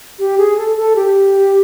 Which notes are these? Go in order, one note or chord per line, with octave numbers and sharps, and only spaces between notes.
G4
G#4
A4
A4
G4